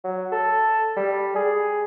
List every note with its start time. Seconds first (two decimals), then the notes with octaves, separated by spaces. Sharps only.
0.04 F#3
0.32 A4
0.96 G3
1.36 G#4